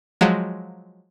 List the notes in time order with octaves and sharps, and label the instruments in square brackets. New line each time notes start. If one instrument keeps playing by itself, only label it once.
[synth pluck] F3 F#3 G#3